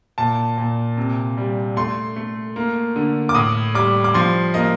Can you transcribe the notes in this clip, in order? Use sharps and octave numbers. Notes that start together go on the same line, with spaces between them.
A#2 A5
A#2
C3
G3
A3 C6
A3
A#3
D3
D6
A2 D#6
G3 D6
D6
F3 C6
A#3 D#5